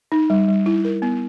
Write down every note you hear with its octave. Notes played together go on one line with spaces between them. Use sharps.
D#4
G3
G3
E4
A#4
B3